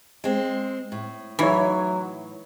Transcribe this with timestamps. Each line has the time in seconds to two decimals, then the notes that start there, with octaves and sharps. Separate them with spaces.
0.24 G#3 C4
0.92 A2
1.39 E3 F#3 D#4 E4 C#5